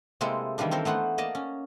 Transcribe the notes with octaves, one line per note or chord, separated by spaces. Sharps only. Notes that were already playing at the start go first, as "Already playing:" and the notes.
C3 G#3 A#3 C4 E4 A4
D#3 E3 G3 A#3 D4
C4 A4 A#4 C5
A3 B3 C5 F#5
A#3 D5 D#5 A5
C#4